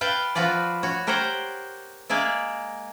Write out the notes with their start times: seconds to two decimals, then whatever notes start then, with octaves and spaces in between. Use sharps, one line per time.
0.01 B4 F5 G5 A5
0.35 F3 F4 F#4 B4 D5
0.83 F#4 C#5
1.07 G4 A#4 C5 C#5 F#5 G5
2.09 G#3 A#3 G#4 D5 E5